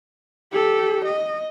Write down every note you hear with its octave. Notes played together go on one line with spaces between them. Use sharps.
G4 A4
D#5